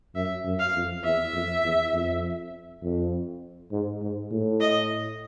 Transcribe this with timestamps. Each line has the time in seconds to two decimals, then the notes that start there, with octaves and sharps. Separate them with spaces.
0.15 F#2 E5
0.45 F#2
0.59 F5
0.74 F2
1.04 E2 E5
1.34 F2
1.64 E2
1.93 F2
2.82 F2
3.72 G#2
4.02 G#2
4.31 A2
4.61 D#5